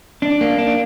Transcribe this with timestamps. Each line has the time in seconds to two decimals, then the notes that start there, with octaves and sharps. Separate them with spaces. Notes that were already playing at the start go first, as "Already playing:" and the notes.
0.22 D4
0.41 A#3
0.58 D4